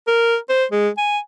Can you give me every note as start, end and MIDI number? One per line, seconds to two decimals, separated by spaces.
0.07 0.37 70
0.50 0.65 72
0.72 0.89 56
0.98 1.19 80